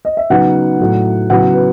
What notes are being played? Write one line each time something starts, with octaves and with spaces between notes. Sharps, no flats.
D#5
E5
C#3 F#3 B3 D#4 F#5
A2 F#3 A3
C#3 F#3 B3 E4 F#5
B4